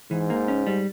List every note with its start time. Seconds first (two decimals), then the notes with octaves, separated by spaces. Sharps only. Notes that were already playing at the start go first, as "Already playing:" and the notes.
0.11 G#2 E3
0.30 A#3
0.48 C#4
0.67 G3